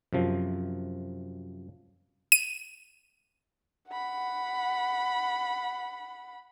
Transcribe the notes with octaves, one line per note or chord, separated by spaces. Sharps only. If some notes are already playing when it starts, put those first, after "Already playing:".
F#2 C3 F3
D#7
F#5 B5